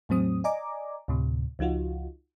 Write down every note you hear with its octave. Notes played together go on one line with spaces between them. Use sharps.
E2 A2 F#3 C4 D#6
D5 D#5 G#5 A#5 D6
D2 A2 C3
C#2 F3 D#4 F4 F#4